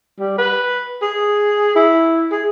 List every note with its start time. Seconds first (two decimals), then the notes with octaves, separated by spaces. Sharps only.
0.19 G3
0.38 B4
1.02 G#4
1.76 E4
2.31 G#4